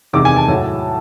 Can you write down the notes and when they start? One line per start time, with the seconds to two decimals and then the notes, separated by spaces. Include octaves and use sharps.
0.13 E2 C3 D#3 G#3 D6
0.25 G#5
0.36 A5
0.48 A2 F#3